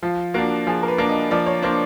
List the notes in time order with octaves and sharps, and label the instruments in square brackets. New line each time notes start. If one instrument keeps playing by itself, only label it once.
[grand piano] F3 [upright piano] F4
[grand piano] A#3 D4 [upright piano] F#4
[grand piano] F3 [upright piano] G#4
[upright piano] A#4
B4
[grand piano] A#3 D4
[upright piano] D#5
[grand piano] F3 [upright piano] D5
[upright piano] C#5
[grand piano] A#3 D4 [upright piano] C5